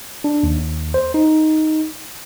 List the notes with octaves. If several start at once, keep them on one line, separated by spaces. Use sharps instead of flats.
D4
D#2
C5
D#4